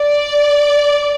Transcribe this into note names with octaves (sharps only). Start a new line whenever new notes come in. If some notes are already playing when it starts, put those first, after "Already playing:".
Already playing: D5